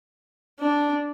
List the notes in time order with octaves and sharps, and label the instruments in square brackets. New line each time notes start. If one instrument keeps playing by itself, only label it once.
[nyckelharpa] D4